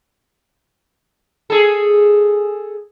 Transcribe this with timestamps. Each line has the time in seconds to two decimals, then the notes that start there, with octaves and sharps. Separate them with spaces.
1.50 G#4 A4